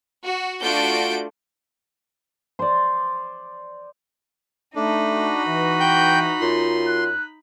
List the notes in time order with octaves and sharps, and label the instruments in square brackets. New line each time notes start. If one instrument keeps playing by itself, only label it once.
[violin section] F#4
A3 D4 F4 F#4 G6 D7
[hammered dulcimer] C5 D5
[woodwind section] A3 [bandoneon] D4 [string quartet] D#4 B5
[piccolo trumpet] F#4
[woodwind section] E3
[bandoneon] G5 G6
[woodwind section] F#2 F4 [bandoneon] C6
[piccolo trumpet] F#6